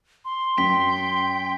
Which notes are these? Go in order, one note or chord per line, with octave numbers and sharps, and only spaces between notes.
C6
F#2 G5 B6